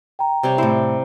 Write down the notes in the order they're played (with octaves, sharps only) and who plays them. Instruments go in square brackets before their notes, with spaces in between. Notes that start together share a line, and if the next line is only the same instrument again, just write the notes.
[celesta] G5 A#5
[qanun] C3 G3 C#5
[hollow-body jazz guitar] A2 E4 [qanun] C5